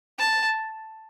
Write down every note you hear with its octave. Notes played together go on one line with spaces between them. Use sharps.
A5